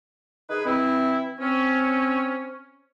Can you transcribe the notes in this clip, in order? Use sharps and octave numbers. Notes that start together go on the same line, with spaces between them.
D#4 G#4 B4
E3 C4 E4
C4 C#4